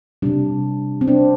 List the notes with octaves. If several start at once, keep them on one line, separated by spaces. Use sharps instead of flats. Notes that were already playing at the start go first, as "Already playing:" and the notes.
C3 G3 D4
C4
D4